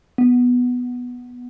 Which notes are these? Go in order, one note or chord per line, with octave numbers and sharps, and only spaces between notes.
B3